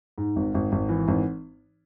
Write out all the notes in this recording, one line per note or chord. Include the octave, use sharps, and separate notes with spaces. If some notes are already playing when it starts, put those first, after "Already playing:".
G#2
G#1
G#1
G#1
E3
G#1